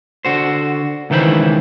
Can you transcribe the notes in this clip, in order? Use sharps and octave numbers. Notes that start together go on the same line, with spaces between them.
D3 F#4 C5
C#2 D#3 E3 G4 C5 B5